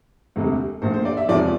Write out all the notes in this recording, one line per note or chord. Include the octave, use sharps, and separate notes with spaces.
E1 D2 C3
A#1 A#2 A3 C5
C5
D5
E5
E1 E2 C3 F3 D5